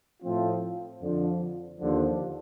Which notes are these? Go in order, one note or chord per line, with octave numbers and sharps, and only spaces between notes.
A2 F3 A3 C4 F4
F2 D3 F3
D#2 D3 F3